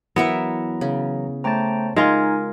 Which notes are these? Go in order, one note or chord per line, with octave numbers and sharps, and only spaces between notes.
E3 F#3 B3 E4 A#4 E5 A#5
C#3
A3 C5 C#5 G5 A5 A#5
G#3 D#4 F4 A#4 G#5